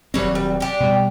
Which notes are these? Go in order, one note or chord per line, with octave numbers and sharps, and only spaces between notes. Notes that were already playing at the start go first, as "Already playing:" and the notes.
D#1 F#3 G3 C4 C#5
G3
D4 G4
B2 G3